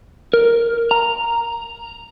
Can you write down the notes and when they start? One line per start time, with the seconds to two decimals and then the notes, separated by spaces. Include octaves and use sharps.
0.33 A#4
0.91 A#5